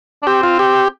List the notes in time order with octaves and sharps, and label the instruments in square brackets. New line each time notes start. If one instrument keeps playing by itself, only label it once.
[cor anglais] D4
[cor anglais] C4 [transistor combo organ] G4
[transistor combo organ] F4
G4